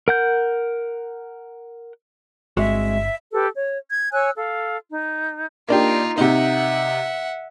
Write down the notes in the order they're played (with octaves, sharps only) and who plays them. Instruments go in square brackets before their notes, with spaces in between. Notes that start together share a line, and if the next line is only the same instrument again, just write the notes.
[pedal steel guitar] A#4 F#5 G6
[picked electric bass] G1 [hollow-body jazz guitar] G#3 C4 F#4 [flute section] E5
[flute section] G4 A4 B4
C#5
G#6
C#5 G#5 E6 F#6
A4 F5
D#4
[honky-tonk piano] A#3 D4 G4 [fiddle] D#4 F4
[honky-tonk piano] C3 D#4 [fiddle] E5 F#5